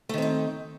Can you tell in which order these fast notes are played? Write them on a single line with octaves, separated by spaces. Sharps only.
A3 D#3 C4 D#4